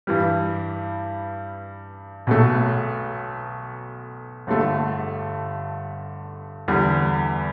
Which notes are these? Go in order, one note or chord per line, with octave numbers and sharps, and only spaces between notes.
G2 E3 G3
B1 B2 A3
G1 G2 D3 A3
E2 D3 G3